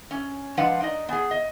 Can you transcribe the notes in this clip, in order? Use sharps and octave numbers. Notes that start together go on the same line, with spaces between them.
C#4
F3 G#3 D4 B4 F5 F#5
D#4 D5 D#5
B3 G#4
D#5